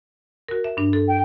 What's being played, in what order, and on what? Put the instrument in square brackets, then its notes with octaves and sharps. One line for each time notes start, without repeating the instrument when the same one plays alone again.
[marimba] F#4 A#4
E5
G2 D4
A4
[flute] G5